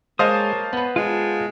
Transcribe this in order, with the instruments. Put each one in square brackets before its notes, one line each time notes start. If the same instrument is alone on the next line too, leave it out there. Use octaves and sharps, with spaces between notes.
[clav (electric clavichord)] G#3 [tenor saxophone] A#3 [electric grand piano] C5 D#5 F5 [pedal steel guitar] C#5 A5 D#6
[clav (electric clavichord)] B3 B4
[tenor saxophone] G#3 [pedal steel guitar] F4 A5